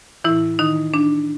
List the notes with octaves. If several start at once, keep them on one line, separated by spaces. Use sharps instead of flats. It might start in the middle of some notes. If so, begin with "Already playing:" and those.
A2 E3 E4
D#3 D#4
D4